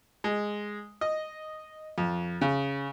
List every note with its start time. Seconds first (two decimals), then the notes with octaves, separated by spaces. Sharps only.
0.24 G#3
1.01 D#5
1.98 F2
2.41 C#3